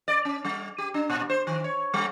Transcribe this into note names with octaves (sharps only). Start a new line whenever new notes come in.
D5
C#4
G3
G4
D4
A#2
C5
D#3
C#5
G3